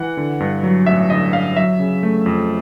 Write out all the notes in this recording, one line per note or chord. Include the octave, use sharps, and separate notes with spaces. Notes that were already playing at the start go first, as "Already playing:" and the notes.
Already playing: E3 F#5
D3
G2
F#3
A1 E5
D3 D#5
G2 F5
F#3 E5
C#3
A3
F2